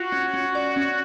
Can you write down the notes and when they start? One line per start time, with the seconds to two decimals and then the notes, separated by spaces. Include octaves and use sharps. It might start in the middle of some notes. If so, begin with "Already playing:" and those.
Already playing: F4 F#4
0.12 C#4
0.34 C#4
0.55 D5
0.76 C#4